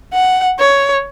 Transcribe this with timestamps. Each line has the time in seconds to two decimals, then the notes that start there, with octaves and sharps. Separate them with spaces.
0.13 F#5
0.59 C#5